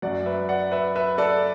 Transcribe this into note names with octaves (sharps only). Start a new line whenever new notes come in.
F#2 F#3 D5 F#5
B4 E5
D5 F#5
B4 E5
B4 E5
A4 D5